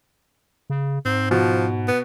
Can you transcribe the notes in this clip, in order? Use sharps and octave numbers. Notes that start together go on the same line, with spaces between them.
C#3
G#2 C4
B2 F3
B3